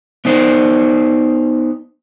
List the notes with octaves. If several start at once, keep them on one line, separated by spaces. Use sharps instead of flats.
B3 D#4 C5